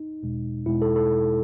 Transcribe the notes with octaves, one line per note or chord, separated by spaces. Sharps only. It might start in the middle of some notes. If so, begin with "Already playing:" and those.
Already playing: D#4
E2 B2 G#3
E2 B2 G#3 E4
A4
A4